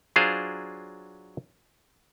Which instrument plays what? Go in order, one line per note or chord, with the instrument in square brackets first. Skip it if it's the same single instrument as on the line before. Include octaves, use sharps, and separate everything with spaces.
[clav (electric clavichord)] F#3 D4 F4 G#4 C5 F5